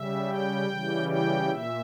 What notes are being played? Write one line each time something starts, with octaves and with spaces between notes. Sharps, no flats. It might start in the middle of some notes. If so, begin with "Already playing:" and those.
Already playing: C#3 G3 E5
G5
C#3 E3 G3
G5
A#2 E5